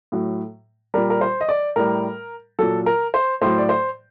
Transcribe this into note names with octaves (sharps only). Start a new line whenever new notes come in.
A2 F#3
A#2 G3 A#4
A#4
C5
D#5
D5
A2 G3 A#4
A#2 F#3 A4
A#4
C5
A2 F#3 C5
D5
C5